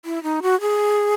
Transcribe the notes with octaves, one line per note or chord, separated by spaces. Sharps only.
E4
D#4
F#4
G#4